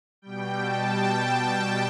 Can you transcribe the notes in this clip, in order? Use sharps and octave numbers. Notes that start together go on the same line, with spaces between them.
B2 G3 G5
A5
G5